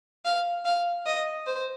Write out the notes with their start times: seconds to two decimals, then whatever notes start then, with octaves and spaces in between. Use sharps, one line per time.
0.25 F5
0.65 F5
1.06 D#5
1.46 C5